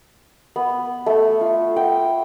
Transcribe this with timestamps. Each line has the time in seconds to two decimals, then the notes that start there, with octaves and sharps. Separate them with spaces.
0.56 B3
1.06 A3
1.41 F4
1.76 G5